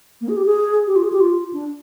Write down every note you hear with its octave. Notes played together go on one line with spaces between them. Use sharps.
A#3
G#4
G4
G#4
G4
F4
G#4
G4
F4
D4